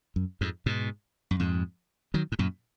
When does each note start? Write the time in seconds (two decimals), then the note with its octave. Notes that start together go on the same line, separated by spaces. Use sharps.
0.16 F#2
0.41 F2 G#2
0.66 G#2 B2
1.31 F#2
1.40 F2 G#2
2.14 D#3 F#3
2.32 G#2
2.39 F#2 A#2